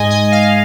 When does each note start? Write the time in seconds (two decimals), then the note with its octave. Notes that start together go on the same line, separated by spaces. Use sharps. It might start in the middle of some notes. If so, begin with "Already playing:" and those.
Already playing: G#2 G#3 D#5 G#5
0.10 D#5 G#5
0.32 F5